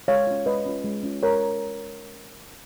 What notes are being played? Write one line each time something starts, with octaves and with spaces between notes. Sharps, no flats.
G#3 C#5 F5
C#4 F4
G#3 B4 D#5
C#4 F4
G#3
C#4 F4
G#3 A#4 C#5